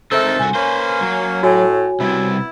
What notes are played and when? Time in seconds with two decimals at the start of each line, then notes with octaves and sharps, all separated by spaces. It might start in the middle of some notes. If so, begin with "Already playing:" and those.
0.12 D#3 C4 D#4 A4 C5 E5 F6
0.39 C2 F#4 G#5
0.55 A#3 C#4 B4 C5
1.01 F#3
1.43 A2 F#4 C#5 G#5
2.00 C3 G3 B3 E4